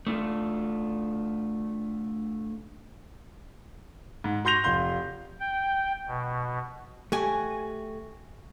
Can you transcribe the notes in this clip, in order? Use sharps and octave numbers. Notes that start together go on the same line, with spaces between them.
A3 D4 F4
G#2
F#4 C6 G6 A#6 F7
F1 F4 C6 G6
G5
B2
A3 F#4 G4 G#5